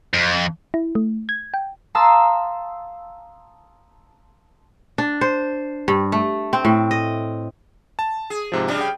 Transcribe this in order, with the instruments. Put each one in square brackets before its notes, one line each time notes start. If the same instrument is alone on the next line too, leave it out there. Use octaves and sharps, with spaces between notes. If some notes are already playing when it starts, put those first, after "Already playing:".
[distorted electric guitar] F2
[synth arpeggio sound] E4
A3
G#6
G5
[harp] F5 A5 A#5 C6 D#6 E6
[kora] D4
C5
G2
A3
C4
A2
D#5
[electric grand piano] A5
[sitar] G#4
[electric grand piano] G#2 C3 F3
[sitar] C#3 G3 [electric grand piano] D4
[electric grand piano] G5